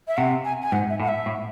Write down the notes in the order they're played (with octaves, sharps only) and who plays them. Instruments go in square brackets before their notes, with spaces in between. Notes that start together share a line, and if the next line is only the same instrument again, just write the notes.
[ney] E5
[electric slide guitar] C3 [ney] F#5
[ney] G#5
G#5
[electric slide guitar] G#2 [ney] F#5
[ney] E5
[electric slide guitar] A2 [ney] F#5
[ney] E5
[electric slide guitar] A2